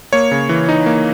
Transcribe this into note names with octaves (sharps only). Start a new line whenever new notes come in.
A#3 C#5
C#3
E3
D#4
A#3